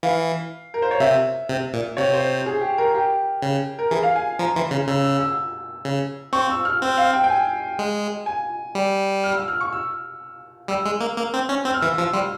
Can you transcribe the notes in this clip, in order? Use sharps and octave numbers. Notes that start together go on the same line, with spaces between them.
E3 F5
A#4
C5
C#5
C3 E5
C3
A#2
C3 C#5
C5
G#4
G4
A#4
G4
C#3
A#4
E3 G#4
F5
G#5
F3 A#5
E3 C6
C#3
C#3 E6
E6
E6
C#3
C4 C#6
E6
F6
C4 E6
F5
G5
G5
G#5
G#3
G#5
G3
F6
E6
F6
C#6
E6
G3 E6
G#3
A#3
A#3
C4
C#4
C4 E6
F6
E3 E6
F3 E6
G3 C6